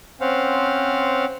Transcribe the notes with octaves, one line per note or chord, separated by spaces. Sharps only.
C4 C#4 C5 F5 F#5